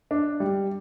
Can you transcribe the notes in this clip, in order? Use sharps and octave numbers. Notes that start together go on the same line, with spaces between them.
D4
G3